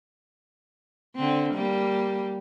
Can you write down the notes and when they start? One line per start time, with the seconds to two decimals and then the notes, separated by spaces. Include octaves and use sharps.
1.16 D3 C4
1.54 G3 A#3